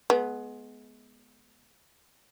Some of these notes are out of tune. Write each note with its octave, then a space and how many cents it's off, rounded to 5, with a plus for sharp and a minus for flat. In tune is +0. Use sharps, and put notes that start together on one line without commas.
G#3 +30 B3 +0